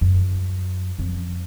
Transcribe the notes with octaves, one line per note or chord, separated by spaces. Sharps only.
F#2
F2